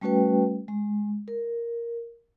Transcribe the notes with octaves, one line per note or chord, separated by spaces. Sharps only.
G3 A3 C#4 F#4 B4 G5
G#3
A#4